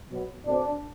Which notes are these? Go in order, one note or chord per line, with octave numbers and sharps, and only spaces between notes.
B2 F#3 B3
B2 A3 C4 D4